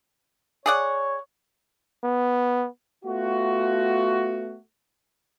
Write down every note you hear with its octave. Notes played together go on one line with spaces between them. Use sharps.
G#4 C#5 D5 F#5
B3
A3 B3 F4 F#4